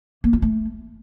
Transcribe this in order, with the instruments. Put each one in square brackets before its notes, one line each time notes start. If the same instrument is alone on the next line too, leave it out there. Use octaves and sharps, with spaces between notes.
[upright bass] A#3
F4
A3